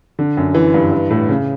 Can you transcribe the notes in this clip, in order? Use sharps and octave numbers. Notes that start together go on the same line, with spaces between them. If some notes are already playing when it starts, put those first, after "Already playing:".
D3
F#2
E3
G2
E3
A2
C#3